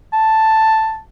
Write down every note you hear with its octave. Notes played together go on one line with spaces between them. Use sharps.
A5